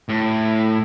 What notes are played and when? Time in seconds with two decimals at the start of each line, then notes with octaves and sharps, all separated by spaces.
0.09 A2